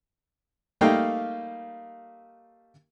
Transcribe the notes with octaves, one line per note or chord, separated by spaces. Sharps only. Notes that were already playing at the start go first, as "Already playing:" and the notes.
G3 A3 A#3 D#4 F5 G5